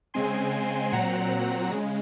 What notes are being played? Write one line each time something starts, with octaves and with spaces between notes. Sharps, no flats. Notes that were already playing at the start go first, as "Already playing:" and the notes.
C#3 G#3 C4 G#5 C6
A#2 F#3 C4 F#5 A#5
C#3 G#3